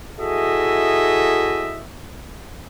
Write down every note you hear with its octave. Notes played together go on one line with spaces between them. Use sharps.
E4 F#4 G#4 A4 D#5 E5